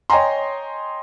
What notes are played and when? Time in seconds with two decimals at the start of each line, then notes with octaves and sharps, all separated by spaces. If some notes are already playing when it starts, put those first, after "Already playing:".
0.10 C#5 D#5 G5 G#5 A#5 C6